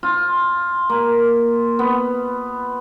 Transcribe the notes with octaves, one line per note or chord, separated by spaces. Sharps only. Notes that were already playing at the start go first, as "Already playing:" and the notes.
F4
A#3
B3